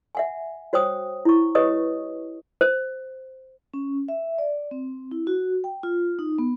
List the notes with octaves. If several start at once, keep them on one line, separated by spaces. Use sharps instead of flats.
E5 F#5 G#5
F#4 C5 C#5 G5 D#6
E4 C#6
G4 B4 C#5 D#5 D#6
C5
C#4
E5
D5
C4
E4
F#4
G5
F4
D#4
B3